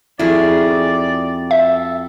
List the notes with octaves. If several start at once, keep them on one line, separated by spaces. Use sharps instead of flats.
F2 E4 F#4 G#4 D5
A4 E5